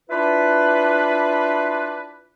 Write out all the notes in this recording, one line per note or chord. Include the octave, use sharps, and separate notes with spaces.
D4 E4 F4 B4